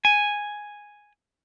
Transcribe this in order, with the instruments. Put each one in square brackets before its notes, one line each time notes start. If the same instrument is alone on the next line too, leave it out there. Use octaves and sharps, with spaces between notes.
[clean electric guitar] G#5